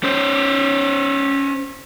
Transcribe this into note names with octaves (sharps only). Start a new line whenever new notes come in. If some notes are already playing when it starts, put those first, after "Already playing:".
C#4 C5